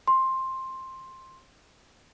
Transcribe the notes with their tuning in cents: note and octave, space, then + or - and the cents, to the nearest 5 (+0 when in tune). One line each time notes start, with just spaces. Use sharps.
C6 +10